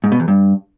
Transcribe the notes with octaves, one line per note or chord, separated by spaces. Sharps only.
G#2
B2
E2
G2